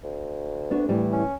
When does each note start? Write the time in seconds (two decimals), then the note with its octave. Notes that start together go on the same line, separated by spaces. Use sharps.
0.04 D2
0.71 B3 D4 F#4
0.89 A2 E3 G3
1.13 C#4